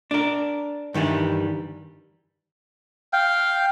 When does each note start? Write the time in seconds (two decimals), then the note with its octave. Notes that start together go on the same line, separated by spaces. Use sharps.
0.11 D4 A#4
0.94 G2 D#3 E3 G3 D4
3.13 F5 G5